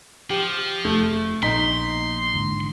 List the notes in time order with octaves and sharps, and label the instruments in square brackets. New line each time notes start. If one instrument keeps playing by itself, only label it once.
[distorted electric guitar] F3 [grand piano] G4
[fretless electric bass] F1 [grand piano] A3
[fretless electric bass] A#1 A#2 B3 [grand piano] D#4 B6 [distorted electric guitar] C6
[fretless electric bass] G#2 D3 E3